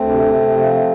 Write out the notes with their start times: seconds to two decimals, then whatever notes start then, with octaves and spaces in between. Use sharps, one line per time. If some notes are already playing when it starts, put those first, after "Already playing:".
Already playing: D2 A3 C4
0.08 C3
0.25 C3
0.41 C3
0.57 F3